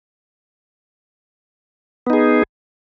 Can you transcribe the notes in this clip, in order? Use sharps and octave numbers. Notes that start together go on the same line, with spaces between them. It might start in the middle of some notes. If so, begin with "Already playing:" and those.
B3 D#4 G#4